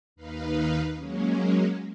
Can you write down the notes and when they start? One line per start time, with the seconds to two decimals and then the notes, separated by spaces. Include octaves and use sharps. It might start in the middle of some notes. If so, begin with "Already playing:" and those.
0.16 D#2 D#4 B4 F5
0.96 F#3 G#3 A#3 C#4